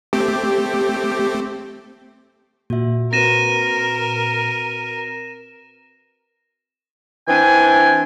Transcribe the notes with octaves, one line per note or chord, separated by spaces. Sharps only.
A3 C4 G4
A#2 F#4 E5
C4 F#4 A#4 B4 A#6 D#7 E7
E3 C4 D4 G5 G#5